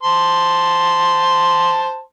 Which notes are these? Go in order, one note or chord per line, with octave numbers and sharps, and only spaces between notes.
C5 A5 C6